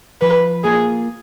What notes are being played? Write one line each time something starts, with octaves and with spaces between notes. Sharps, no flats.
F3 B4
A#3 F4 G#4